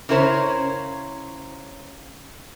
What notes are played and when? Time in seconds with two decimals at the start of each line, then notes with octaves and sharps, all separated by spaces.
0.09 C#3 C#4 E4 A#4 C5 C#5